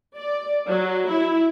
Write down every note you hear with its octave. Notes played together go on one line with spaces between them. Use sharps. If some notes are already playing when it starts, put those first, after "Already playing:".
D5
F#3
E4